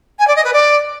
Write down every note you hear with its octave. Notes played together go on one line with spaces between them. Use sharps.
G#5
D5
D#5
B4
D5